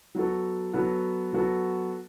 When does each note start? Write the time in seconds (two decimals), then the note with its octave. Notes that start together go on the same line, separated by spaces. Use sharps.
0.15 F#3 B3 F#4 A4
0.73 F#3 B3 F#4 A4
1.33 F#3 B3 F#4 A4